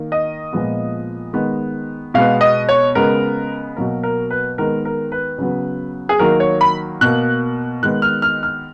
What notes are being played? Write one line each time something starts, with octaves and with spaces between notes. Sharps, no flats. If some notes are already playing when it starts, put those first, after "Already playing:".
Already playing: D#3 A#3
D#5
A#2 F3 G#3 B3
D#3 G#3 B3
B2 G#3 B3 F5
D#5
C#5
C#3 G#3 B3 A#4
B2 F#3 A#3 A#4
A#4
B4
D#3 G#3 B3 A#4
A#4
B4
C#3 F#3 B3
G#4
D#3 F#3 A#3 A#4
C#5
B5
B2 A#3 F#6
D#3 G#3 B3 F#6
F6
F6
F6